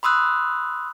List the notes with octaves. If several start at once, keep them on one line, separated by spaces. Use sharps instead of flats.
B5 C6 D#6 E6 F#6